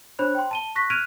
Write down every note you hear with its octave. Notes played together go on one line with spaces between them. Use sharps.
D4 C5 C#5 B5 F#6
G5 C6
A5 D#7 G7
C#6 F#6 A#6 B6
F6 F#6 G#6 D7 D#7 F7